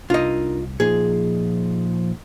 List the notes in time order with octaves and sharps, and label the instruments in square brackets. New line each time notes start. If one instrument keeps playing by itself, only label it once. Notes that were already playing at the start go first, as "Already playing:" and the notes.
[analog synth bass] C2 [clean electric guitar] D4 D#4 A#4 [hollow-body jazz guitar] F4 D#5
[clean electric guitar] A#2 D#4 F4 [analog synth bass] F3 [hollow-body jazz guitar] G#4